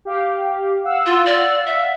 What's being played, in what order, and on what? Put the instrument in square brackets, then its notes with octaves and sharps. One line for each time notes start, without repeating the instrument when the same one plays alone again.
[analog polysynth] G4 F5
F5 F#5 E6
[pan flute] F4
D5
E5